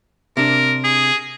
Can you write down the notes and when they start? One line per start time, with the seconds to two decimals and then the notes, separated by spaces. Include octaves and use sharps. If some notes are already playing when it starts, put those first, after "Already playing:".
0.37 C3 D4 A#4
0.84 G#4